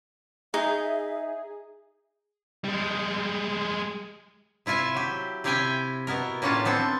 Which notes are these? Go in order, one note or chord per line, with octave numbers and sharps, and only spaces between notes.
D#4 G#4 E5
G3 G#3
C3 E4 F4 E5 G#5
F#3 G4
C3 E4 G4 F5 G5 G#5
B2 B3 E4 A#4
A2 A#3 C#4 D4 F4 A5
B3 C4 D4 A4